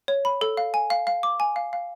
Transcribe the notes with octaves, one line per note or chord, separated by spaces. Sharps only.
C#5
B5
A4
F5
G#5
F5
F5
D6
G#5
F5
F5